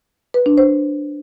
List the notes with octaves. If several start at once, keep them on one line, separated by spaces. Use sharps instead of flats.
B4
D4
C5